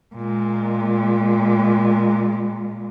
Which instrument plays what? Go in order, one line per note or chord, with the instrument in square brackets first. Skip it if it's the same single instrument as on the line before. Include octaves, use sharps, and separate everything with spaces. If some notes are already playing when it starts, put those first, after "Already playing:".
[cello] A#2 G#3